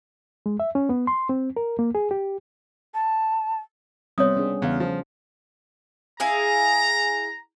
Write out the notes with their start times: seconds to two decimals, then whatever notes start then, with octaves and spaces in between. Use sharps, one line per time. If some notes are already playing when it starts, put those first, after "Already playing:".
0.46 G#3
0.60 E5
0.75 C#4
0.89 B3
1.07 C6
1.29 C4
1.57 A#4
1.79 A#3
1.95 G#4
2.11 G4
2.94 A5
4.18 C3 G3 B3 C#5 D#6
4.37 C#4 D4 G#4
4.62 E2 C#3 F5
4.80 F3
6.20 E4 G#4 F5 A#5